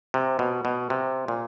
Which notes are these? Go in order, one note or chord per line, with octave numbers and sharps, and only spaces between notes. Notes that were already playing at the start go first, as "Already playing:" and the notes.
C3
B2
B2
C3
A#2